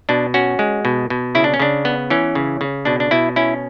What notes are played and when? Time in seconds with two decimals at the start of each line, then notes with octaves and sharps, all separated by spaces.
0.09 B2 D4
0.34 C#4 F#4
0.59 G#3
0.85 B2
1.10 B2
1.35 C#3 E4
1.44 D4
1.54 C#4
1.60 C#3 D4
1.85 B3
2.10 E3 C#4
2.35 C#3
2.61 C#3
2.85 B2 D4
3.00 D4
3.11 B2 E4
3.36 C#4 E4